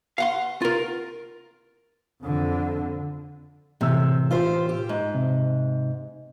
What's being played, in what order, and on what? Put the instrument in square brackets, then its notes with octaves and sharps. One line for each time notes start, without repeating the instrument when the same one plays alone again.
[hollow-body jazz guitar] F5 F#5 C6
F4 A#4
[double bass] F2 D3
[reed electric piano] A2 E3 E6 [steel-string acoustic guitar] C3
[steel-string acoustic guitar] F4 G4 C5
G4
G#2
[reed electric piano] C3